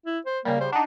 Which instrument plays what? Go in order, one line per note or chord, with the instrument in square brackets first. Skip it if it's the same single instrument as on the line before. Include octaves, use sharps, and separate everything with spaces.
[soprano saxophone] E4
C5
[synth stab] C#3 G3 [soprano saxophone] A#3
[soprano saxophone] C5
[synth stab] D4 D#4 [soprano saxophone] F#5